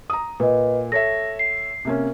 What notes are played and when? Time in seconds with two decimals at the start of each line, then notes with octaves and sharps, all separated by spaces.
0.10 A#5 D#6
0.40 A#2 B4 D#5
0.92 A4 C#5 E5 A#6
1.39 C7
1.85 C3 A#3 C#4